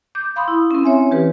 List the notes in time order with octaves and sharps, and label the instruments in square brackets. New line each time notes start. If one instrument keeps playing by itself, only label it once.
[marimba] D6 G6
F5 B5 C6 D#6
E4
C4 C#4
C#5 E5 G#5 C6
E3 G4 B4